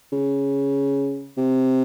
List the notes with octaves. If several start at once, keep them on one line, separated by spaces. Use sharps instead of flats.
C#3
C3